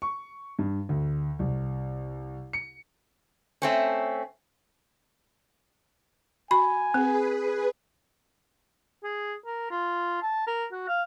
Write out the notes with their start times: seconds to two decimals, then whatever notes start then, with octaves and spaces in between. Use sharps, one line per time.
0.02 C#6
0.59 G2
0.89 D2
1.39 C2
2.53 C#7
3.62 A3 C4 C#4
6.51 F#4 G#5 B5
6.94 C4 G#4 B4
9.04 G#4
9.46 A#4
9.71 F4
10.22 A5
10.47 A#4
10.72 F#4
10.88 F5